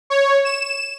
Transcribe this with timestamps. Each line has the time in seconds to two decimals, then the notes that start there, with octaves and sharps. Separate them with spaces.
0.10 C#5
0.45 E7